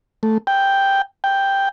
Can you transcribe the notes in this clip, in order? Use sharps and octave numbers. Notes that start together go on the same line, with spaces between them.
A3
G5
G5